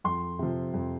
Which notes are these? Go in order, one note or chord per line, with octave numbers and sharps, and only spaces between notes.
F2 C6
C3 F3
F2